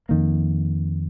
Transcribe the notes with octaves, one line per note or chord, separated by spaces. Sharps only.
F2 D#3 A#3